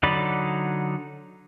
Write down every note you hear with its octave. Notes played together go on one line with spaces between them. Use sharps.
D3 F#3 D#4 D5 B5